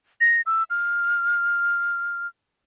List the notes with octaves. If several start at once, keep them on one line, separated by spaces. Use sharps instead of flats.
A#6
E6
F6